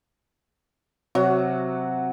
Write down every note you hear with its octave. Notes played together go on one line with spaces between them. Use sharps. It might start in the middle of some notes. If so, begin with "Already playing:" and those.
C3 F#3 F#4